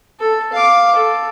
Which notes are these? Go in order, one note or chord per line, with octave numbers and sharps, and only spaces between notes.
A4
F5 D6
A4